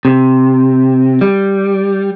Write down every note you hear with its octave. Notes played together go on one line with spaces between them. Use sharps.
C3
G3